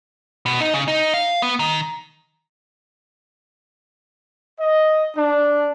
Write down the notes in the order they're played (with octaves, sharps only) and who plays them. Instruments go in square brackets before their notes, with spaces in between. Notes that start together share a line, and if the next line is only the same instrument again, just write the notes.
[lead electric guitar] B2
D#4
C#3
D#4
F5
B3
D#3
[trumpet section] D#5
D4